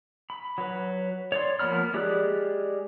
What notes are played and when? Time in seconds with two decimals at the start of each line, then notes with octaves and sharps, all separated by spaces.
0.30 B5
0.58 F#3 B4
1.32 C#5 D5 C6
1.59 F3 A#3 B3 B5 F6
1.94 G#3 G4 G#4 D5 F#6